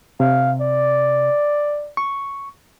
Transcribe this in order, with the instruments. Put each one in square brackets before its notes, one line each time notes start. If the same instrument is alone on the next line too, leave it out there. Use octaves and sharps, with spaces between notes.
[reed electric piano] C3 [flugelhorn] F5
[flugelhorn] D5
[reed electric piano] C#6